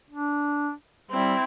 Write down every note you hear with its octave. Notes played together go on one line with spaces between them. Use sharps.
D4
G3 C4 E4